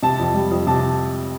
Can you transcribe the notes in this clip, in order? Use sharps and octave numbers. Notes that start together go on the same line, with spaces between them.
C3 A5
F2
G3
F2
C3 A5